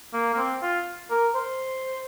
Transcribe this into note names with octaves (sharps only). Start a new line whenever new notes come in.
A#3
A#3
C4
F4
A#4
C5